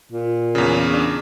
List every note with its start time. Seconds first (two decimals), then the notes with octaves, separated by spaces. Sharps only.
0.12 A#2
0.55 E2 C#3
0.93 D4